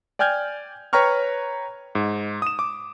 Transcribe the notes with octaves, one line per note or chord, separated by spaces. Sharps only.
D5 G5 G#5 F6 G6 G#6
B4 C#5 G5 A#5 C#6 F6
G#2
D#6 E7
D6